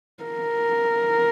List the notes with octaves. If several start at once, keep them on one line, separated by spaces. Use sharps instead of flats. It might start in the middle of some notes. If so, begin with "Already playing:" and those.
A#4